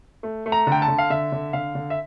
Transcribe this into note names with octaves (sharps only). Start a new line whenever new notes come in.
A3
A3
A#5
D3 G5
A5
D3
F5
D3 E5
D3
D3 F5
D3
E5